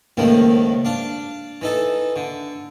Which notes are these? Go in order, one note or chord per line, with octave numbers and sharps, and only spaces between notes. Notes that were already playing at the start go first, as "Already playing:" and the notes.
C#2 A2 D#3 F3 A#3
D4 F5
E3 D#4 A4
D3